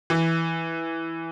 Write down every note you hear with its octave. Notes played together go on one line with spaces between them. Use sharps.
E3